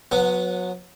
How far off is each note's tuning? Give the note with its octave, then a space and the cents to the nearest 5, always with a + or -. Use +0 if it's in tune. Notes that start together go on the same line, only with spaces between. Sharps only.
F#3 -25 B3 +0